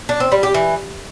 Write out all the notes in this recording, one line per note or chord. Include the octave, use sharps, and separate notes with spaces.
D4
C4
G3
G4
E3